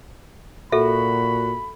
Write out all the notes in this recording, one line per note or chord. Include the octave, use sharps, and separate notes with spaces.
A#2 F#4 A4 E5 B5